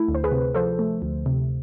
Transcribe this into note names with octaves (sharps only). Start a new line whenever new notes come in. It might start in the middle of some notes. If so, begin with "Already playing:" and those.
Already playing: A3 E4
D2
C5
G#4 B4
C3
F3 A4 C5
A3
D2
C3